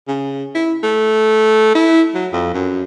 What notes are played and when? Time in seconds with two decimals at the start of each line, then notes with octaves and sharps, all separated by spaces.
0.08 C#3
0.55 E4
0.83 A3
1.75 E4
2.15 F#3
2.33 F2
2.53 F#2